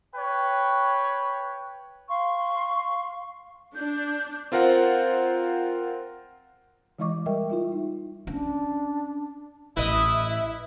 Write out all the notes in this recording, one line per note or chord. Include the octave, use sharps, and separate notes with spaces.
B4 C#5 G5
F5 C6 C#6
D4 G6
C4 F4 A#4 C5 F#5
E3 G#3 E4 D#5 C#6 D6
G3 A#4 D#5 E5 G5
E4 F4 E5
D#4
C#4 D4
A1 E4 B4 D#5 E5